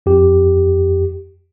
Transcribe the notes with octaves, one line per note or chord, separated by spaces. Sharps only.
F2 G4